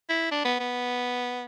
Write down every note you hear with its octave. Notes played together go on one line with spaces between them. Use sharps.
E4
D4
B3
B3